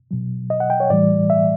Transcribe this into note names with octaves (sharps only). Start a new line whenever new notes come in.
B2 F#3
D#5
F#5
G5
C#5
A2 E3 G3 D5
E5